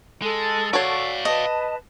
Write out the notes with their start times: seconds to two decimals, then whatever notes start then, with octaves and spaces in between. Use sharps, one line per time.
0.22 G#3 A4
0.73 F#4 C#5 D5 F5
1.25 B4 D#5 A5